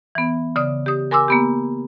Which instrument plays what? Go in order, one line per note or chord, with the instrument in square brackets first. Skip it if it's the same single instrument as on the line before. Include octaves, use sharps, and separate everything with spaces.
[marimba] E3 B3
C#3 D5 D#6
G4 D#6
A#4 G#5 C6 D6 E6
A#3 B3 G4